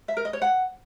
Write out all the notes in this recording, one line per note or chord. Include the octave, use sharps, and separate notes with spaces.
E5
A#4
D#5
C#5
F#5